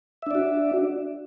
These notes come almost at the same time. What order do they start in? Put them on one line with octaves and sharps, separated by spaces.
E5 D4 D5 F#4